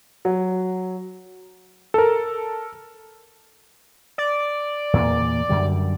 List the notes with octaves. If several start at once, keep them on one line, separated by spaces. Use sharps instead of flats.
F#3
A4 A#4
D5
E2 A#2 A#3
F#2 D3 G3